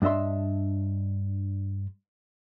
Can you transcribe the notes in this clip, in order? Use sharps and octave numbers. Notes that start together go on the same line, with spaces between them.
G2 D4 D#5 E5 C6